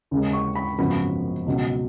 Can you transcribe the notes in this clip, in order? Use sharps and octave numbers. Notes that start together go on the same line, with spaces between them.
D#2 C#3 G#3
C#6
B5
G#1 F#2 C#3 F3 B3 B5
C#2 B2 F#3